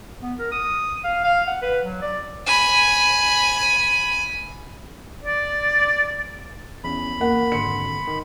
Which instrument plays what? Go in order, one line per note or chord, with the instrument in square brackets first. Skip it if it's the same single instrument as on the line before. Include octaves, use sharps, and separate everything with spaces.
[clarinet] B3
A#4
D#6
F5
F5
F#5
B4
F#3
D5
[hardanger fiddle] G#5 B5
[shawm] D5
[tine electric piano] E2 [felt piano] C#4 [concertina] B5
[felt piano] A#3 A#4 F#5
[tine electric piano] G#1 D3 [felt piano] C6 C#7
[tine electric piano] D#3